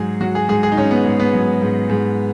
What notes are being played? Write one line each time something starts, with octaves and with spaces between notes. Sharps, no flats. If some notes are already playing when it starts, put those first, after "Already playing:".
Already playing: G#2 F#3 G#4
F#3 F#4
G#4
G#2 G#4
G#4
D#4
G#2 C#4
B3
G#2
B3
F#3
G#2
G#2